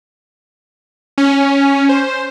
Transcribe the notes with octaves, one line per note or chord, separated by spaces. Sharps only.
C#4
C5